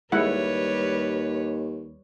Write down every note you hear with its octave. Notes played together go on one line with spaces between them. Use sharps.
D#2 G3 G#3 E4 B4 C#5 F#5